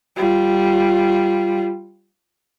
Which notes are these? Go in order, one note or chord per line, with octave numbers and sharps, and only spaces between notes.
G3 F4